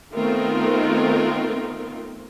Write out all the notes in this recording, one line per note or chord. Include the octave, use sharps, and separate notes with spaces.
D#3 A3 B3 C4 F4 A#4